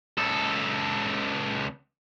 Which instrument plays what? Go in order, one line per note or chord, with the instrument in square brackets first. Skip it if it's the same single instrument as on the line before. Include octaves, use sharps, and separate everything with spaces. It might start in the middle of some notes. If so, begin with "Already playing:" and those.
[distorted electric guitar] C#2 A4